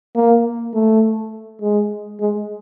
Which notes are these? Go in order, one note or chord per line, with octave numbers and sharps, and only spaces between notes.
A#3
A3
G#3
G#3